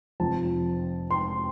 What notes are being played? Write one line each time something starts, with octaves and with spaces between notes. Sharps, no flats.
F1 F2 F3 A5
C6